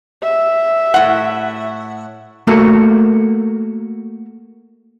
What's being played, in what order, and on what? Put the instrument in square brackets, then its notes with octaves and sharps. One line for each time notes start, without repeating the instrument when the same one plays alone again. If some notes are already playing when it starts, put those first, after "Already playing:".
[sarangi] E5
[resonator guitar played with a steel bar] A2 F#5
[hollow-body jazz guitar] A3 A#3 F#4 A4 A#4